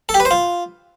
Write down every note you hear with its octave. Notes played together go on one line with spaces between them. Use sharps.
A4
G4
B4
C5
F4